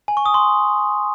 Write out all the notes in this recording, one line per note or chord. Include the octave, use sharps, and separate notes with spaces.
G#5
C#6
D#6
C6